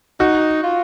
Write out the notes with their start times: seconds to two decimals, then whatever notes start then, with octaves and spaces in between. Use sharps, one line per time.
0.20 D#4 F#4
0.64 F4